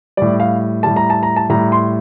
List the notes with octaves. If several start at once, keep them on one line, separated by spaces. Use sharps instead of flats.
A2 G3 D5
F5
A2 G3 A5
A#5
A5
A#5
A5
A2 G3 A#5
C6